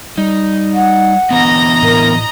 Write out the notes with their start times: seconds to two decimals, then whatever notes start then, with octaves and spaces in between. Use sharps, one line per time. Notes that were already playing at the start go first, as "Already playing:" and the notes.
0.18 G3 D#4
0.74 F#5
1.31 D3 E3 B3 D#5 A#5
1.83 A2 A#4